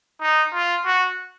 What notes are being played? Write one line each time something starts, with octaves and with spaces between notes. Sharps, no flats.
D#4
F4
F#4